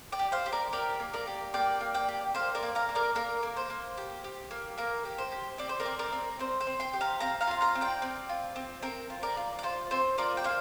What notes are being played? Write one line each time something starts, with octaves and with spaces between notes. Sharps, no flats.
D5 G5
G4
C5 F5
G4
A#4 D5
G4 A#4 D5
A#3
A#4 D5
G4
A#3 D5 G5
A#3
D5 G5
G4
A#3 C5 F5
A#4 D5
A#3
F5 A#5
A#3
A#4 D5
A#3 A#4
A#3
C5
A#3
G4
G4
A#3
A#3 A#4
G4
C5
G4
C4 D5
C5
A#4 D5
C4
A#4 D5
C4
C4 C5
C5
C4
G5 C6
G4
F5 A#5
C4 F5 A#5
F5 A#5
F4 C6
F5 A#5
C4
D5 G5
C4
F4
C4
C4 A#4
F4
A#4 D5
F4
D5
F4 C5
C4 C5
F4 A#4 D5
G5
A#3 C5 F5